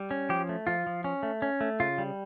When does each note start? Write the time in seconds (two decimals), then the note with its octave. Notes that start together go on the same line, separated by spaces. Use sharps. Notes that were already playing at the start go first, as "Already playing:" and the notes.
Already playing: G3
0.11 C#4
0.29 F3 G4
0.49 A3
0.67 F3 F4
0.87 F3
1.04 C#4
1.23 A3
1.42 C#4
1.61 A3
1.80 C#3 F4
1.98 G3